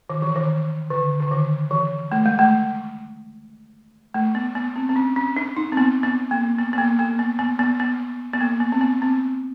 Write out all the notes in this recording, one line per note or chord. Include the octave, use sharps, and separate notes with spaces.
D#3
E3
D#3
D3
D3
D#3
E3
A3
G#3
A3
A3
B3
B3
C4
C4
C#4
C#4
D4
D#4
C4
B3
B3
A#3
B3
B3
A#3
A#3
B3
B3
B3
B3
B3
A#3
B3
C4
B3
C4